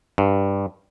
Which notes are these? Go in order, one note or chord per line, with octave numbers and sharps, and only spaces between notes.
G2